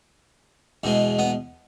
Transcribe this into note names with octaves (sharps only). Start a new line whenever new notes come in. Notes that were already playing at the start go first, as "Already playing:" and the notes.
E2 B2 G#3
B3